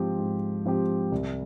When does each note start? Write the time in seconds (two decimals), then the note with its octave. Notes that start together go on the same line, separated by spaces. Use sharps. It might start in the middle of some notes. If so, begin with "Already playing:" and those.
Already playing: G#2 F3 C4 G4
0.19 G#2
0.65 F3 C4 G4
1.12 C2